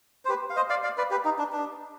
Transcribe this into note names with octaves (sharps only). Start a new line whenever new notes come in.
C5
G4 B4
F5
C5 D#5
D5 F5
D5 F5
B4 D5
G4 B4
D#4
D4
D4